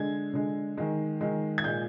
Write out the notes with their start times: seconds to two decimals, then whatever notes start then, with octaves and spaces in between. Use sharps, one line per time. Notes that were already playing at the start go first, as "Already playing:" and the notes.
Already playing: D3 G#3 G#6
0.34 D3 G#3
0.77 D#3 G#3
1.21 D#3 G#3
1.58 G#6
1.64 A#2 G#3 G6